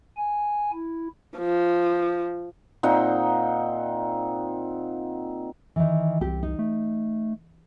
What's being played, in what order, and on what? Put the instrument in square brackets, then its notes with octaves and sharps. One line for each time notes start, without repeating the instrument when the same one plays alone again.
[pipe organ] G#5
E4
[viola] F3
[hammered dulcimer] A#2 C4 D#4 F#5
[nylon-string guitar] D#3 E3
[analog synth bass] C2 [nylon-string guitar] C4 G4
[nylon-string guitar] D#4
[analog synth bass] A3